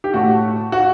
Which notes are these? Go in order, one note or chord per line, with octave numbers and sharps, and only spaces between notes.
G4
A2 A3 F#4
F#4